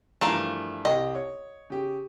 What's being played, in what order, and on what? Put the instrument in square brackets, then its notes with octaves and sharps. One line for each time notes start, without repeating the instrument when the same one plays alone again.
[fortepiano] G2 E3 F3 [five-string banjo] A3 A#4 F5
[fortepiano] C2 G4 G5 [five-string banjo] D#5
[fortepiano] C#5
C#3 G4